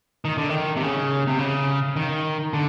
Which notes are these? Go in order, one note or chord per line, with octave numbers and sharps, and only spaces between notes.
D#3
D3
D#3
C3
C#3
C3
C#3
D#3
D3